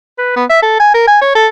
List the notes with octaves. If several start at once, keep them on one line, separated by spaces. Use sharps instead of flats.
B4
B3
E5
A4
G#5
A#4
G#5
C#5
A4